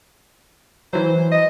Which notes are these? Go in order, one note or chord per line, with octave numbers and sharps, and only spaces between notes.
E3 F#3 C5
D#5